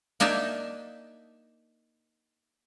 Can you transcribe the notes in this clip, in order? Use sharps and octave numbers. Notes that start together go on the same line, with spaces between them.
A#3 D4 D#4 E5 A5